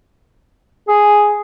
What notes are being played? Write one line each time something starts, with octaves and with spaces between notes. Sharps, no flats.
G#4